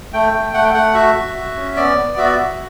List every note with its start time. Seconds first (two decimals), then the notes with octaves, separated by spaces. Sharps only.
0.13 A3 G5
0.33 A3
0.53 A3 F#5
0.64 G5
0.74 A3 F#5
0.94 F#4 E5
1.15 F#4
1.35 F#4
1.56 C#4
1.76 B3 D5
1.97 B3
2.17 F#4 E5
2.25 D5
2.32 E5
2.38 F#4